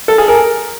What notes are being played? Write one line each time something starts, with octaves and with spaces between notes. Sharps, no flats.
A4
G#4
A#4